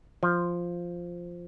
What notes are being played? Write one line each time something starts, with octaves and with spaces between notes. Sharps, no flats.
F3